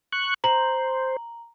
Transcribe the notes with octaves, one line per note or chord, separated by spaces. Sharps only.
C#6 F#6
C5 A#5 F#7